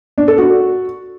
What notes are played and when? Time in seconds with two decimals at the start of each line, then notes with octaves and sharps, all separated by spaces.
0.18 D4
0.28 A4
0.38 F#4